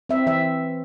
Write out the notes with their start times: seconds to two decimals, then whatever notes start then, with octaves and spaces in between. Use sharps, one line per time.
0.09 C4 E5
0.27 E3 E5